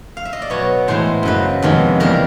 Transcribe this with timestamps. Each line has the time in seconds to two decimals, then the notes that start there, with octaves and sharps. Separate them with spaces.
0.17 F5
0.25 E5
0.33 D#5
0.42 D5
0.50 B2 F#3 B3 C#5
0.88 A2 E3 G#3 B3 C5
1.23 F#2 C#3 F#3 A#3 B4
1.62 F2 C3 D#3 G#3 B3
2.00 C#3 E3 G3 A#3 A#4